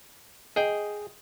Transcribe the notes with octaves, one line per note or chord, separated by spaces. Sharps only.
G#4 D#5 G5